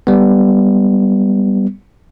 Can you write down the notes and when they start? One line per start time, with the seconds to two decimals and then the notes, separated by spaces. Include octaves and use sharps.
0.07 G3 B3